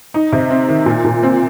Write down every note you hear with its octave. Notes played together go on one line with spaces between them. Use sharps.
D#4
C3
C4
D#3
A#2
A#2
C4